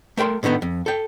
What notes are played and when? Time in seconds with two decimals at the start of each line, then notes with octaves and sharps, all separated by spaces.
0.17 A3 A#4 G5 B5 C6
0.43 A2 D3 D#3 B3 D#4
0.62 F2
0.86 A4 G5